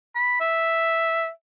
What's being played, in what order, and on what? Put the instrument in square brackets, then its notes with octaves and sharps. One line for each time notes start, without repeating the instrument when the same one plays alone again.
[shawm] B5
E5